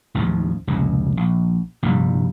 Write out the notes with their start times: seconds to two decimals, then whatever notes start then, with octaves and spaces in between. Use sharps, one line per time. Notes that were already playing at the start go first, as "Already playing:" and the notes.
0.15 A1 D#2 G#2 F3
0.67 F1 C#2 A#2
1.17 A#1
1.83 A#1 G2 C3 G3